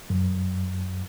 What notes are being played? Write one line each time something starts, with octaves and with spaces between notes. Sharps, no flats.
F#2